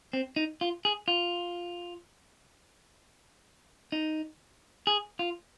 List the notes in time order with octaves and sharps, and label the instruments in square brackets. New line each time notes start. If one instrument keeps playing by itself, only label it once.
[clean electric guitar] C4
D#4
F4
G#4
F4
D#4
G#4
F4